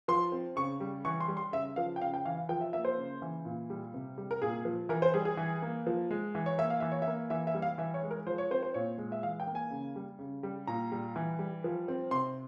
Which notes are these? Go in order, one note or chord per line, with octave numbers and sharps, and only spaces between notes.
F3 C6
C4
C#3 C#6
G3
E3 C#6
C6
G3
C6
C#3 E5
F3 F5
G5
C#3 F5
G5
E3 F5
F5
F3 G5
E5
A#3 E5
C5
C#3
E3
A#2
G3
C3
G3
A#4
A#2 G#4
F3
E3 A#4
C5
G3 G#4
G#4
E3
A#3
F3
G#3
E3
C#5
A#3 E5
F5
E3 E5
C#5
E5
A#3
E3 E5
E5
G3
F5
E3 E5
C#5
G#3
A#4
F3 C5
C#5
C4 C5
C5
A#2 C#5
G#3
E5
E3 F5
G5
A#3
G#5
C#3
G3
C#3
G3
A#2 A#5
G3
E3
G3
F3
C4
C3 C6